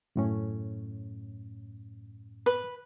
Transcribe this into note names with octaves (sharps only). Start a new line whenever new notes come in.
F#2 A2 C#4
B4